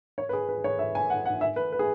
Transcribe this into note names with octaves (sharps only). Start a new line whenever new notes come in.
C#5
B4
G#4
B4
C#5
E5
G#5
F#5
F#5
E5
B4
B4
G#4